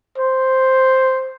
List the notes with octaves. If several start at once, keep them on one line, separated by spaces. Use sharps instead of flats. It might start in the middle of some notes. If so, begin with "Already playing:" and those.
C5